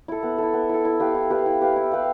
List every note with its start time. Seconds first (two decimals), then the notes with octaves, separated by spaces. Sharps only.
0.08 E4 A4
0.23 B3
0.38 E4 A4
0.53 B3
0.69 E4 A4
0.85 E4
1.00 G4 B4 F5
1.15 E4
1.30 G4 B4 F5
1.46 E4
1.62 G4 B4 F5
1.76 E4
1.92 G4 B4 F5